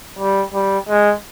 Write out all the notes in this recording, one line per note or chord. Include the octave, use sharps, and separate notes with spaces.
G3
G3
G#3